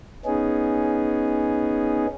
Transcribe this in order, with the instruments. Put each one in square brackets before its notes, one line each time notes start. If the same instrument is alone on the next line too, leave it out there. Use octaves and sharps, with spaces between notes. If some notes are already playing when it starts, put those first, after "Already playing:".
[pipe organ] B3 C#4 D#4 G#4